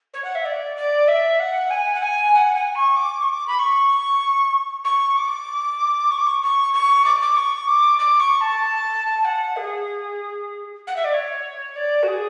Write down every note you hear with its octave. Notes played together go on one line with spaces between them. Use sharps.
C#5
F#5
E5
D5
D5
E5
F#5
G#5
F#5
G#5
F#5
G#5
C#6
D6
C#6
D6
B5
C#6
C#6
D6
C#6
D6
C#6
C#6
C#6
D6
D6
C#6
D6
D6
C#6
A5
F#5
G#4
F#5
E5
D5
C#5
D5
F#4
G#4